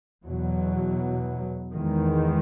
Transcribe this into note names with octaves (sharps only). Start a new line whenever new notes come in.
E2 B2 F#3
E2 D#3 G#3